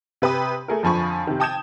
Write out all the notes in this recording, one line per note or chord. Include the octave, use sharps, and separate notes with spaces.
C3 B4 G5 D#6
A3 G#4 A#4
F2 D3 F3 G#5 B5 C#6
C3 D#3
G5 A5 D#6 G6 G#6 E7